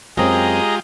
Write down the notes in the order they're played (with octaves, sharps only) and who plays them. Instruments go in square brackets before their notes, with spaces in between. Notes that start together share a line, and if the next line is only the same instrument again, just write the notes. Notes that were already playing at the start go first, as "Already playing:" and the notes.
[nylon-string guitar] F#2 C4 [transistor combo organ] G#3 F4 G4 [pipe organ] G#4 D#5 A#5